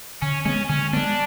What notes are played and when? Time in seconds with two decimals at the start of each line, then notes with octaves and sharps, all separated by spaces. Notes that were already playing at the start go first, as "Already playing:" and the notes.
0.22 D3 C#4
0.45 G#3 B3 C#4
0.69 D3 C#4
0.93 G#3 B3 D4